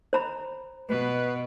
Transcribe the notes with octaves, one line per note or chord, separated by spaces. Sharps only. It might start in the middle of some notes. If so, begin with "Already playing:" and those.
C5 A#5 B5
B2 B4